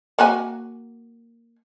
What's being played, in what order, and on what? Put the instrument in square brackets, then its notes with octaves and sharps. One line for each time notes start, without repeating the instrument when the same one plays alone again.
[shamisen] A#3 F#4 G#5